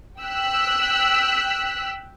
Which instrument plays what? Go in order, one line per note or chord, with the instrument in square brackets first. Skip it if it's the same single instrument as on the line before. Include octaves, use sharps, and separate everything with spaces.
[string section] G5 E6 F#6 B6